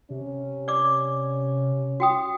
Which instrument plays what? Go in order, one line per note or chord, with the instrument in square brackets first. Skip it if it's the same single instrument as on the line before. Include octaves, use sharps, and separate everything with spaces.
[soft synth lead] C3 [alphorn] C#4
[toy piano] D5 D6
F#4 G5 D#6